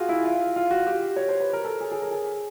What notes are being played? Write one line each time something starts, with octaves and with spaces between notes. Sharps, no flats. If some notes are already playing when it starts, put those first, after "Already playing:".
Already playing: F4 F#4 G#4
E4
F4
F4
F#4
G4
C#5
C5
B4
A#4
A4
G#4
G#4
A#4
G#4